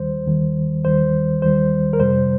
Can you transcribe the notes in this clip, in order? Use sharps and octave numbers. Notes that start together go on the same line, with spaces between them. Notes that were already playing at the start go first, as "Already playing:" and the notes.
Already playing: D#2 D#3 G3 C5
D#2 D#3 G3
D#2 D#3 G3 C5
D#2 D#3 G3 C5
A#4
F2 C3 G3 C5